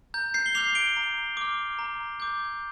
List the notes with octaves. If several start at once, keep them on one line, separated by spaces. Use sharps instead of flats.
A#5 G6
G6 C7
G7
D6 F6 C7 F7
D7 G7
A#5
D6 F6
A#5
D6 G6